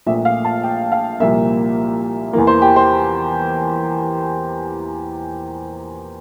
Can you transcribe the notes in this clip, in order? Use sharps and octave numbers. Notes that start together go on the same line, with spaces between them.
A#1 A#2 A3 E5
F5
A5
G5
F5
C2 A#2 F3 A#3 E5
E2 E3 A#3
C5
G4
C5